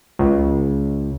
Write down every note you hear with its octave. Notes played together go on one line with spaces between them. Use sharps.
C#2